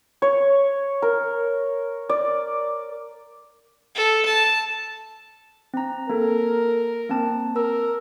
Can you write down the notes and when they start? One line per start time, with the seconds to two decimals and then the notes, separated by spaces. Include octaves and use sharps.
0.22 C#5
1.02 A#4
2.09 D5
3.95 A4
4.26 A5
5.74 C4 A#5
6.10 A#3 A4 A#4
7.10 A#3 C4 A5
7.56 A#4 E6